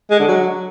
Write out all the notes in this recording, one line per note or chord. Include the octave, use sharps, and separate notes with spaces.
G#3
D3
F#3